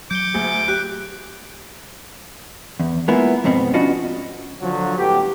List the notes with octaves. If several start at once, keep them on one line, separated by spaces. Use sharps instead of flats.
F#3 D6 G6 C#7 G7
D2 G#4
D7
G4 F#6
E2
G#3 A#3 B3 E4 F4
F2 G#2 B2 B3 C4
C#4 D4 F4 F#4 D5 D#5
D3 F3 F#3
G1 A2 B3 G4